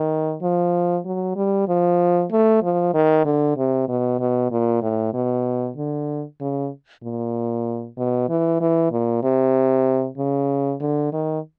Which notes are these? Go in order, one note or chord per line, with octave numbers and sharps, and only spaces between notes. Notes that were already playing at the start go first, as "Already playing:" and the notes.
Already playing: D#3
F3
F#3
G3
F3
A3
F3
D#3
D3
C3
B2
B2
A#2
A2
B2
D3
C#3
A#2
B2
E3
E3
A#2
C3
C#3
D3
D#3